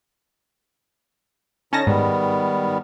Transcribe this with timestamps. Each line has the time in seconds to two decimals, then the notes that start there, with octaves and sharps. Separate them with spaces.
1.73 D3 C#4 D#4 A5 A#6
1.87 G#2 D#3 G3 B3